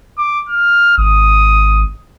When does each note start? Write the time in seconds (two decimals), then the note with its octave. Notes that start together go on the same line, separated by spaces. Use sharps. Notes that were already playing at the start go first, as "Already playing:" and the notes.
0.18 D6
0.49 F6
0.98 G#1 D#6